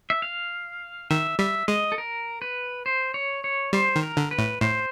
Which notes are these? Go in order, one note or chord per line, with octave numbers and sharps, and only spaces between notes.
E5
F5
D#3 E5
G3 E5
G#3 D#5
A4
A#4
B4
C5
C#5
C#5
G3 C5
D#3
A#4
D3
B4
A2
A2 C5